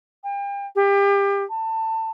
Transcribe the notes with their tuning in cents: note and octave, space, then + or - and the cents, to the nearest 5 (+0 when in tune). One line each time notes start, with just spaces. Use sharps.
G5 +40
G4 +30
A5 +25